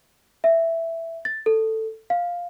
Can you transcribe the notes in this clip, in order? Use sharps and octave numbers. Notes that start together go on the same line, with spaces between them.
E5
A6
A4
F5